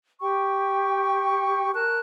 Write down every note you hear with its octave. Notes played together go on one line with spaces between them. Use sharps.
G4 G5 C#6
A#4 A5 F#6